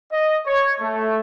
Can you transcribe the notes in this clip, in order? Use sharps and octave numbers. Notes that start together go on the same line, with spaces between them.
D#5
C#5
A3